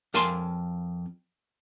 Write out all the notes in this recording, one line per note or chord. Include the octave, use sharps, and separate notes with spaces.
F2 A#4 G#5 A5 C6